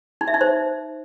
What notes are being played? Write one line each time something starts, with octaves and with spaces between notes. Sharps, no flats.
D#4
E5
D#4
C5